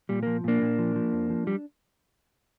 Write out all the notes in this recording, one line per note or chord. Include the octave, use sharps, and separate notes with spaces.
A#2 G3
F3 A#3
A#2 A#3 D4
A#2
F3
F3
F2
F3
G3